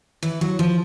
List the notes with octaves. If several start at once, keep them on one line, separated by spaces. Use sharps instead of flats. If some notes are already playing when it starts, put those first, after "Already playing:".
E3
F#3
F3